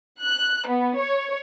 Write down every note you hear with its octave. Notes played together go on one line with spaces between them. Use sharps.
F#6
B3
C#5